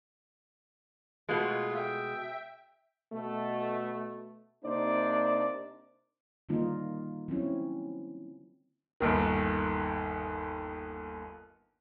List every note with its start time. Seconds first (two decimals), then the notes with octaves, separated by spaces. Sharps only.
1.29 B2 G#3 A3 F4
1.76 E5 G5
3.13 B2 A3
4.64 C3 A#3 D4 D#4 C5 D5
6.49 D3 D#3 G3 A#3 D#4 F4
7.28 F#3 C4 C#4 E4
9.00 G1 D#2 D#3